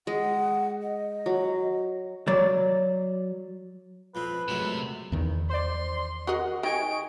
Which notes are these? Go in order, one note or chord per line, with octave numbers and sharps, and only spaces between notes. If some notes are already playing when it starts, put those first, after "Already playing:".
G#3 F#5
D#5
F#3
F#3 D5
F2 F3 C4 B4
F#2 C3 G#3 A3
E2 D#3
C5 D5 C6
F#4 A#4 D#5 F#5
D#3 D#5 G5 G#5 C#6 D7